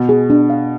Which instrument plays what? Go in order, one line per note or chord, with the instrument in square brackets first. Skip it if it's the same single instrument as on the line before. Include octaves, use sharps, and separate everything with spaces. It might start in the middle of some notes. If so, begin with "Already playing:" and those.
Already playing: [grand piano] B2
[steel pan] G#4
D4
F5